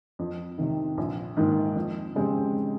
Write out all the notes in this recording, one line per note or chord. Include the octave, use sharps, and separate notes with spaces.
F2
C3 D#3
A#1
G#2 D#3 A#3
F2
C#3 G#3 C4 G4